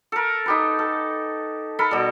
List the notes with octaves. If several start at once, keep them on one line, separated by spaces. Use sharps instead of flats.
A4 A#4
D#4 G4 B4
A4
A4 A#4 B5
B2 G3 A4